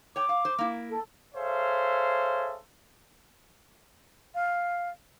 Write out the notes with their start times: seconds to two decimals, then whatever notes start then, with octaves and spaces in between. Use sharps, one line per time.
0.16 C#5 G5 D6
0.29 F5
0.45 C5
0.58 A#3 E4
0.89 A4
1.35 G#4 A4 C5 C#5 E5 F5
4.34 F5